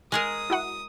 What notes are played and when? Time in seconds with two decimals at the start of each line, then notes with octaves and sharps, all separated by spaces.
0.12 G#3 G#4 A#4 D#6
0.50 E4 F#4 F#5